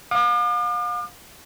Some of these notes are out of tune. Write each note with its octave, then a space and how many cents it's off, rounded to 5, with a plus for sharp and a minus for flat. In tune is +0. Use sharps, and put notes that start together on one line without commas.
F5 +40 D6 +45